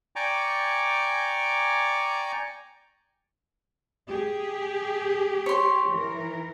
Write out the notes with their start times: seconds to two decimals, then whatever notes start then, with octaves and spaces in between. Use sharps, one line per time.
0.16 D5 G5 G#5 A#5 C#6 D6
4.08 G4 G#4
5.46 C#5 C6
5.90 E3 A#4